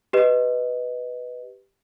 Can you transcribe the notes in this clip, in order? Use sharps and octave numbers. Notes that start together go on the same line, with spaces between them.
G4 B4 D#5